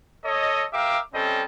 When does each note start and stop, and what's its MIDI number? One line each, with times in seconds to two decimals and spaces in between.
0.25 0.65 69
0.25 0.65 73
0.25 0.65 75
0.73 0.99 67
0.73 0.99 70
0.73 0.99 76
0.73 0.99 77
0.73 0.99 86
1.14 1.43 55
1.14 1.43 60
1.14 1.43 61
1.14 1.43 69
1.14 1.43 75